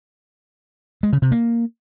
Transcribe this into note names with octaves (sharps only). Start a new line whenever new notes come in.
G#3
C#3
C3
A#3